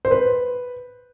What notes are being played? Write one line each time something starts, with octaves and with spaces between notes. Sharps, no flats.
C5
B4